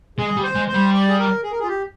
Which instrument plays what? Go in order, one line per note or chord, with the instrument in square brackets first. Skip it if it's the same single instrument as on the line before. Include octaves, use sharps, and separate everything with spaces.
[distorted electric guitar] G#3 [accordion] G#4
[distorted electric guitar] G3
[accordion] C5
[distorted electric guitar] G#3
[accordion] C5
[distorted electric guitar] G3
[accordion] D5
G#4
A#4
G#4
A#4
G#4
F4
G4